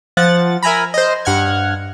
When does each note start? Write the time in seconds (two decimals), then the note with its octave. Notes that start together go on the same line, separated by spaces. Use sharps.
0.17 F3 F#5 A6
0.63 A#4 E5 G#5 A#5 B5
0.94 C5 D#5
1.25 G2 F#5 F6 G#6